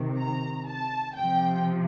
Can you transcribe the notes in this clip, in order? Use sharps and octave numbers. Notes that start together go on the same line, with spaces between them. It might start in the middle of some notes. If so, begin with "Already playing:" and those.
Already playing: C3 D#3
A#5
A5
C3 F3 G5